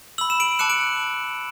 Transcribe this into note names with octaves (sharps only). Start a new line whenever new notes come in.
B5 E6 F#7
E7
D7 F#7
A5 D6 F#6 C#7 E7
D7 F#7